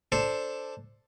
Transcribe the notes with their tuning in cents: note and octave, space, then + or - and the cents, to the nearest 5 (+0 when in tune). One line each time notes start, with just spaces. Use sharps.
D4 +0 A4 +0 C5 +0